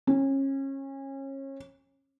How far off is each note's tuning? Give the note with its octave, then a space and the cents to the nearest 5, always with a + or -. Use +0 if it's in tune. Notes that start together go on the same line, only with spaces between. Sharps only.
C#4 -30